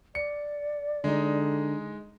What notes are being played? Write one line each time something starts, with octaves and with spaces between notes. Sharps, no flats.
D5 C#7
D3 G#3 D#4